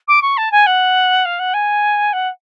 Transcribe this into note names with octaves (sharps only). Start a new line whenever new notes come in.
D6
C#6
A5
G#5
F#5
F5
F#5
G#5
F#5